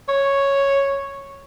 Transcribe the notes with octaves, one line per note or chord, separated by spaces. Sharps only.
C#5